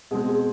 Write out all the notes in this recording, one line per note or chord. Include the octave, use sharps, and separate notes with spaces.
B2 G#3 C4 G#4
G#4